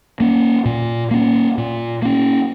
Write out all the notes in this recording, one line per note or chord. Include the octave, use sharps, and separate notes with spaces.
A#3 C#4
A#2
A#3 C#4
A#2
A#3 C#4